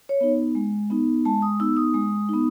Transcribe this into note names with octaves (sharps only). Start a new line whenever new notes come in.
C#5
B3 D#4
G#3
B3 D#4
G#3 A5
D#6
B3 D#4 E6
D#6
G#3
B3 D#4